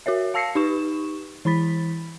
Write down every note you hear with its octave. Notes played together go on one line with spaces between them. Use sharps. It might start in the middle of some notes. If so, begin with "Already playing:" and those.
F#4 A#4 C#5 E5
F5 A5 E6 A#6 C7 C#7
D#4 G4 B4 C#6 E7
E3 E4 B5 A6 B6